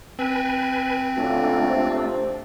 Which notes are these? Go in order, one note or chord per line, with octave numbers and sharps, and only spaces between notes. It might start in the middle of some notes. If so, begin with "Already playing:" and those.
C4 B4 G#5
D2 A3 C#4 D4 F4
C3 F4 C5